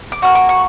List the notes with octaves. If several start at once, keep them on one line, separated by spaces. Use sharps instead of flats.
D6
A#3 C#4 F#4 C#6
D6
C#6